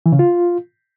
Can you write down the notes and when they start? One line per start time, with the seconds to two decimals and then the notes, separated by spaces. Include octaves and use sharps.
0.06 E3
0.12 C#3
0.19 F4